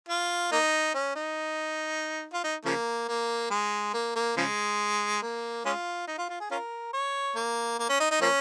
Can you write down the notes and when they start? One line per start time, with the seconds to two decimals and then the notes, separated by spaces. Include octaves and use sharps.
0.09 F4
0.52 A#3 D#4
0.94 C#4
1.15 D#4
2.33 F4
2.44 D#4
2.65 C#3 F3 A#3
3.08 A#3
3.51 G#3
3.94 A#3
4.15 A#3
4.37 C#3 F3 G#3
5.22 A#3
5.65 G#3 C#4 F4
6.07 D#4
6.18 F4
6.29 F4
6.40 G#4
6.51 C#4 F4 A#4
6.93 C#5
7.35 A#3
7.79 A#3
7.89 C#4
8.00 D#4
8.11 D#4
8.21 F3 A#3 C#4